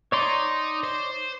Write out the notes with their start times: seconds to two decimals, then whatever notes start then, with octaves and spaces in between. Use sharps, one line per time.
0.12 D#4 C#5 D5 C6
0.84 C5